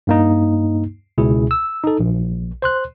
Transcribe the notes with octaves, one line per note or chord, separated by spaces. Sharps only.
G2 A#3 D#4
C#2 B2 E4 G#4
E6
D#4 A4
A#1
C5 C6 F#6